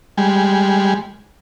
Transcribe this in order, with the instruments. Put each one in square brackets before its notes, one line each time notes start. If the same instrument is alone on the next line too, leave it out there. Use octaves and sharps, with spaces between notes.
[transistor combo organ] G3 G#3